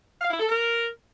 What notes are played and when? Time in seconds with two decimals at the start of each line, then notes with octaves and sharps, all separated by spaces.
0.21 F5
0.31 E4
0.40 A4
0.49 A#4